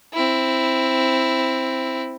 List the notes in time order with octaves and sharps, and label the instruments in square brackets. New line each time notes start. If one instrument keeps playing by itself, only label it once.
[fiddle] C4 E4